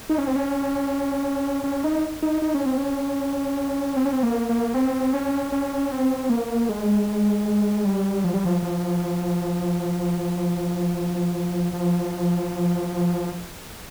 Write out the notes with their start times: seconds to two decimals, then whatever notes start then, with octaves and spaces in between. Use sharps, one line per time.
0.10 D#4
0.18 C#4
0.27 C4
0.36 C#4
1.64 C#4
1.84 D#4
2.23 D#4
2.42 D#4
2.55 C#4
2.66 C4
2.77 C#4
3.96 C4
4.05 C#4
4.13 C4
4.23 A#3
4.49 A#3
4.74 C4
5.14 C#4
5.52 C#4
5.92 C4
6.30 A#3
6.69 G#3
7.85 G3
8.24 F3
8.34 G3
8.45 F3
8.62 F3
11.73 F3